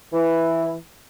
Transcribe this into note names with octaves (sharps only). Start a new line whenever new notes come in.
E3